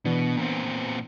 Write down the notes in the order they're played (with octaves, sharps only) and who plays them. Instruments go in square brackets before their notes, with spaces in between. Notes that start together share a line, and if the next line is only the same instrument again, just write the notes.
[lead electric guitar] B2 [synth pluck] E3 B3 D4
[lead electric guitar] A#2 C4